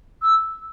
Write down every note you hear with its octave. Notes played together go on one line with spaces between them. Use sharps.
E6